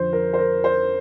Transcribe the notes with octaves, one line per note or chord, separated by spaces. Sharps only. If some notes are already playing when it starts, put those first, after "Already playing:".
Already playing: F2 D3 F3 C5
A#4
C5
A#4
C5